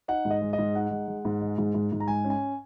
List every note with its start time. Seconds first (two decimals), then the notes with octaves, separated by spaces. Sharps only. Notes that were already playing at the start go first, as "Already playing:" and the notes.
0.08 D#4 F#5
0.25 G#2
0.30 D#5
0.41 G#3
0.53 D#5
0.58 G#2
0.75 D#4 F#5
0.91 G#3
1.08 G#3
1.25 G#2
1.42 G#3
1.58 G#2
1.74 G#2
1.92 G#2
2.00 A#5
2.08 G#3 G#5
2.25 C#4
2.30 G#5